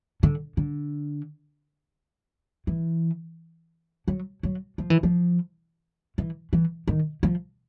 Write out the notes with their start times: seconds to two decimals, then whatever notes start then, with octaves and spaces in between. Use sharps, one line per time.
0.23 D3
0.57 D3
2.67 E3
4.08 F#3
4.43 F#3
4.78 F3
4.90 E3
5.03 F3
6.18 E3
6.53 E3
6.88 D#3
7.23 F3